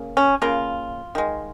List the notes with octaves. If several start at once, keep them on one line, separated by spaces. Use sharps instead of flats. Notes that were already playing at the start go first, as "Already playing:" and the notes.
Already playing: C#3 A#3
C#4
C#3 A#3 F4
D#3 G#3